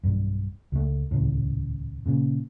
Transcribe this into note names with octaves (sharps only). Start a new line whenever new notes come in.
B1 G2
C#2 A3
D#1 C#2 A2
A#2 C#3